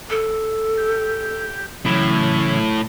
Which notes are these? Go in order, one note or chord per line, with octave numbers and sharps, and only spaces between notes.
A4
G4
A2 C#3 E3 F#3